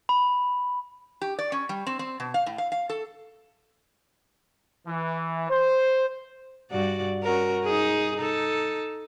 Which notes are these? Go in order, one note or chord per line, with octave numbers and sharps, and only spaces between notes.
B5
G4
D5
C#4
G3
C4
C4
B2
F5
A2
F5
F5
A4
E3
C5
G2 F#4 D5
C#4 F#4 A#4
D#4 G#4
D#4 A4